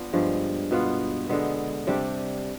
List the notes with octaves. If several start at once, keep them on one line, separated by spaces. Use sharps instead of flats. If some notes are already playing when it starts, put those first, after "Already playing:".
Already playing: B3 D4 F4
G2 F3 G#3
B2 B3 F4
D3 G#3 B3
C3 G3 D4 G4